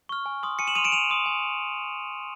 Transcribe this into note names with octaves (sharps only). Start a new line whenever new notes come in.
C#6 F6
G#5
C6 D#6
G#5 C#7 D#7
E7 F#7
C6 D#6 D#7 F7
D7 E7
G#5 D#7 F7
C6 D#6
G#5